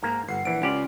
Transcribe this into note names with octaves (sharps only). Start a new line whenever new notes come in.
G#2 A#3 A#5
G1 F#5 C7
A#1 E3 D7
C#2 C#4 F4 G4 D5 F#5